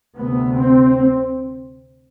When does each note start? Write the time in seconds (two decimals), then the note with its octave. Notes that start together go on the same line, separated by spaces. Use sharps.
0.15 D2 C3 B3
0.57 C4